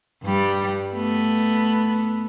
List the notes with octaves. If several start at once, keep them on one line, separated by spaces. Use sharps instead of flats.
G2 G3
A3 B3